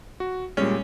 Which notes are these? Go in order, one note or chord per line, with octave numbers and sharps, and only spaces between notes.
F#4
A#2 G3 G#3 C#4